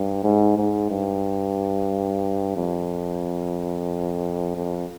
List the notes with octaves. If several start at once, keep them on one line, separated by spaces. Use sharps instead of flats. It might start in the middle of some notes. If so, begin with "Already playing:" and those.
Already playing: G2
G#2
G#2
G2
F2
F2